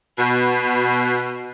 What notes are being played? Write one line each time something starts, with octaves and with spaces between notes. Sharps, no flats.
B2